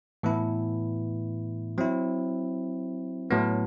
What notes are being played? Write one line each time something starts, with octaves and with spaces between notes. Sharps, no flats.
A2 E3 B3 E4
F#3 C4 E4
A2 F#3 B3